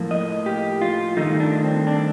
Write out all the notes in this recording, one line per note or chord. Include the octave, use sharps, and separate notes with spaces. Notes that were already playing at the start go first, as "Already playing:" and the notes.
Already playing: A2 F3 A#3
D#5
G4
F4
G2 D#3 A3 D#4
D4
C4
D4